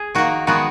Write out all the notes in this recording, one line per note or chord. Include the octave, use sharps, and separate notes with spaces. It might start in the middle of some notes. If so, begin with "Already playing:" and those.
Already playing: G#4
D#3 A#3 F#4
D#3 G#3 B3 F#4